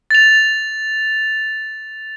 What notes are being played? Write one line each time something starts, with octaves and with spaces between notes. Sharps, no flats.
A6 F7